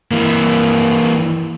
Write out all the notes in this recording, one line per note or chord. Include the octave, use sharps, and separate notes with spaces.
E3 A#3